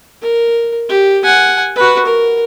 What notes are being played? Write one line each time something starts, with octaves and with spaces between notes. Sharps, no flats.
A#4
G4
F#5 G#5
F#4 B4
A#4